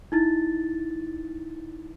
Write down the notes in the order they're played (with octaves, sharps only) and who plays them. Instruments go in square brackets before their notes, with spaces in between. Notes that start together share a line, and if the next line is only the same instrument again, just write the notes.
[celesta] D#4 E4 A6